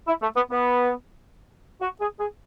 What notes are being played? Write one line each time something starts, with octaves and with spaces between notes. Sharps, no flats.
E4
A3
B3
B3
F#4
G#4
G#4